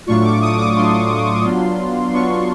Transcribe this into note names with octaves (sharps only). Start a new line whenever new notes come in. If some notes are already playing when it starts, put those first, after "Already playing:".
A2 F#3 A3 D4 F4 C#6
D6
D#6
D6
A2 F#3 A3 D4 F4 C6
F#3 B3 D4 F4
F#3 B3 D4 F4 C#6